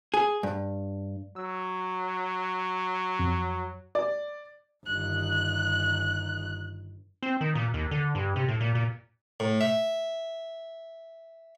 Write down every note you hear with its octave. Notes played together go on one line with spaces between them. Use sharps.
G#4
G2
F#3 E6
F2
D5
G1 D#3 F#6
C4
D#3
A#2
D#2
D3
G2
C3
A2
A#2
A#2
A2
E5